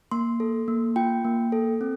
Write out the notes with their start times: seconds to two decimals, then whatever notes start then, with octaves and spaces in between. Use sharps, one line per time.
0.11 A#3 C6
0.40 A4
0.68 A#3
0.96 F4 G5
1.25 A#3
1.52 A4
1.81 C4